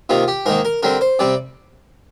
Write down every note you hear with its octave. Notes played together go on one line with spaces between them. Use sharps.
C3 D#3 A#3 F4
G4
G#2 D#3 A#3 A#4
A#4
D3 G3 C4 A#4
C5
C3 G3 C4 D5